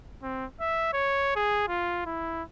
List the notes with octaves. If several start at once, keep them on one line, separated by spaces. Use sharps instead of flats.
C4
E5
C#5
G#4
F4
E4